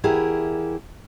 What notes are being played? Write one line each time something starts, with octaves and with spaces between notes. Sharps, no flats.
E2 E4 G4 G#4 A#4